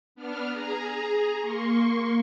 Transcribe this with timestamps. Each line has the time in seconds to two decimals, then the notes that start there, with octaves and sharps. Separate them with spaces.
0.15 B3 D4 F6
0.49 G#4 A#5
1.40 A#3 C6 C#6